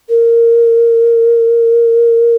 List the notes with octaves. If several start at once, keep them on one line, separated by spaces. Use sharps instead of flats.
A#4